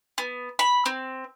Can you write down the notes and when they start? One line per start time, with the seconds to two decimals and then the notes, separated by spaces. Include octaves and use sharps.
0.18 B3
0.59 B5
0.86 C4